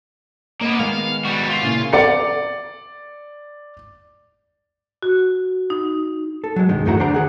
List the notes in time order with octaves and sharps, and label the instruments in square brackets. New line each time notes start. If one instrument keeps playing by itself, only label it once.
[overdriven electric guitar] A#3 B3 [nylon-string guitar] D#5
[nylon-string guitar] D#3 G#3 B3 [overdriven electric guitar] F5
[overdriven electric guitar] G3 F#4
F4
[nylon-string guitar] A#2 C#3 E4
[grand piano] D5 C#7
[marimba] F#4
D#4
[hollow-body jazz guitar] A4
F#3 G#3
B1 G2 D#3 G#3
E2 A2 A3 F#4 A#5
D3 C5 D5 A#5
D#3 G#4 F#5